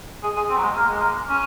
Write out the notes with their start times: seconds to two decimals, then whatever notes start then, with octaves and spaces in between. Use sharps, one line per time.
0.23 G#4
0.36 G#4
0.49 C4
0.57 F#3
0.63 G#3
0.76 A#3
0.88 G#3
1.01 A#3
1.29 C#4